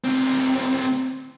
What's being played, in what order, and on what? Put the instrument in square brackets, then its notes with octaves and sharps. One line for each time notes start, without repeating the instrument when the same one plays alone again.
[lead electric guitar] D2 C4